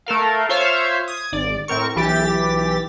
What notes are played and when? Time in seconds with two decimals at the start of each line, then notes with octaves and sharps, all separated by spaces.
0.06 A3 A4 A#4 F5
0.49 F4 C5 C#5 E5 F5
1.08 D#6 G#6
1.32 G#1 D5
1.68 A2 C4 A#4 C#6
1.96 B1 E3 G4 A6 B6